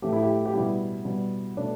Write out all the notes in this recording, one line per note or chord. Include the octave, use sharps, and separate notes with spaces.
A2 E3 A3 G4
E4
G4
G4
B2 G3 E4
B2 G3
B2 A3 D4